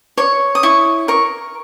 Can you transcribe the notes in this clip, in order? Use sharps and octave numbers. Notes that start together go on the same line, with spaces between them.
C#5 C#6
D#6
E4 C#6
A#4 C#6